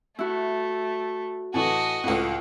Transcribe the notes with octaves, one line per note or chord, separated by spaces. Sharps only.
A3 E4 F#4
A2 E3 F#4 D#5 A5
C#2 A2 F#5 C#6